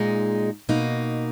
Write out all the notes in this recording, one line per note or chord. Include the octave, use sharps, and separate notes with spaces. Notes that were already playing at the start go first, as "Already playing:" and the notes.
Already playing: A#2 G#3 D#4
B2 A#3 D#4